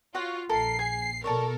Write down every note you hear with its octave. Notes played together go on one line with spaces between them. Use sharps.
F4 F#4 C#5 F#5
A#1 A4 A#4 C7
G#4 G#5
B2 A4 A#4 C#5 D5 A5